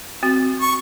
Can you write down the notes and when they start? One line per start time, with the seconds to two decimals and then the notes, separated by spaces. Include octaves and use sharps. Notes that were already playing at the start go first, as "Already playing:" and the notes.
0.23 C4 F#4
0.61 C#6